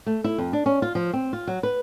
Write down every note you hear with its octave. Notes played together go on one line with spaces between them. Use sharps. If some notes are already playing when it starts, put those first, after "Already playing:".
A3
E4
F2
D4
C#4
F4
F3
C4
F4
F#3
B4